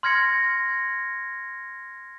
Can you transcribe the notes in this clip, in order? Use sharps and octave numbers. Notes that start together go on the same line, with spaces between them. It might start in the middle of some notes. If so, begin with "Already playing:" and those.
C6 F6 G#6 A#6 C#7